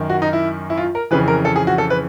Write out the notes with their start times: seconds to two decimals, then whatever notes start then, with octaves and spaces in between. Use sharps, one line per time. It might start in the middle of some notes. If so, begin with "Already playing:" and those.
Already playing: F#2 D#3
0.10 F#4
0.22 D#4
0.33 E4
0.70 E4
0.77 F4
0.95 A#4
1.11 F2 C#3 E3 B4
1.28 A#4
1.45 A4
1.56 G#4
1.67 F#4
1.78 A4
1.90 B4